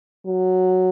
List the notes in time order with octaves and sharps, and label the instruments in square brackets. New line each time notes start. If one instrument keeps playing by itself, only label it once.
[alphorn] F#3